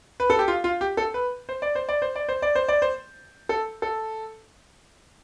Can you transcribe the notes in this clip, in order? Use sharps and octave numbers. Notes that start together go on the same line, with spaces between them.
B4
A4
G4
F4
F4
G4
A4
B4
C5
D5
C5
D5
C5
D5
C5
D5
C5
D5
C5
A4
A4